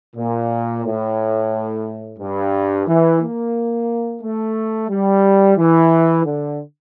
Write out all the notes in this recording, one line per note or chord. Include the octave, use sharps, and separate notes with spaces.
A#2
A2
G2
E3
A#3
A3
G3
E3
D3